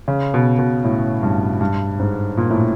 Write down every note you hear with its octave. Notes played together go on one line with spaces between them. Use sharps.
C#3
B2
B2
A2
G2
G2
G#2
A#2
A2